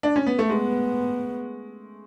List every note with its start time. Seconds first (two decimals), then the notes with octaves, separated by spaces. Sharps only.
0.03 D4
0.16 C#4
0.26 B3
0.39 A3
0.50 G#3 B3